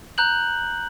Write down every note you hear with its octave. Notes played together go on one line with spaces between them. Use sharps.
A#5 F#6 G6 F#7